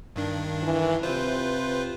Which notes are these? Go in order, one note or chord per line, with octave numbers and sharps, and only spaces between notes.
G2 D#3 D4
E3
C3 F4 B4 C5